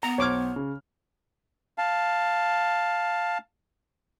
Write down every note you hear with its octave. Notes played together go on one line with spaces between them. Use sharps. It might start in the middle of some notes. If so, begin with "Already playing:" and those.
B3 A#5
B1 C5 C#5 D6 F6
C#3
F5 A5